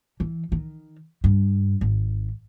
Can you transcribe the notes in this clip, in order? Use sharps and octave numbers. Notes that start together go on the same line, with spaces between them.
E3
D#3
G2
G#1